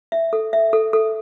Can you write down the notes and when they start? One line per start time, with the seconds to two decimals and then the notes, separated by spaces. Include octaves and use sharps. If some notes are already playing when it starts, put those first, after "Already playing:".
0.12 E5
0.33 A4
0.53 E5
0.73 A4
0.93 A4